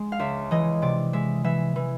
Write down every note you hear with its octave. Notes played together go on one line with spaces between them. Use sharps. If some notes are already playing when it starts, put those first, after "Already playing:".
Already playing: G#3
F5
C#2 E5
E3 D#5
C3 D5
G#3 E5
E3 E5
E3